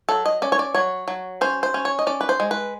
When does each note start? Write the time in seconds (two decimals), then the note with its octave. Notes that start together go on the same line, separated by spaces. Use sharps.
0.09 F#3 A4
0.26 D#5
0.42 C#4 D5
0.52 C#5
0.59 D5
0.74 F#3 C#5
1.08 F#3
1.41 C#4 C5
1.63 C5
1.74 C#4
1.85 C#5
1.99 D#5
2.07 C#4 D5
2.21 B4
2.29 C5
2.40 G#3
2.51 B4